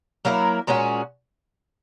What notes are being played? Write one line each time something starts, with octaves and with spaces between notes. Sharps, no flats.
F#3 A#3 E4 A#4
A#2 G#3 C#4 F#4